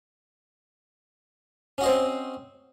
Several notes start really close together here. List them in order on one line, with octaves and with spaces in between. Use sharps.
C#4 F#4 D#5 C5 C4